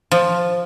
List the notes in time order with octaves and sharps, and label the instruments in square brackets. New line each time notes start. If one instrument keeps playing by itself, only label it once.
[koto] F3